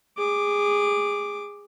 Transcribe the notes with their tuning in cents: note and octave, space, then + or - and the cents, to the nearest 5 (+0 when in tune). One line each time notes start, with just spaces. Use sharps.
G#4 -20 D6 +0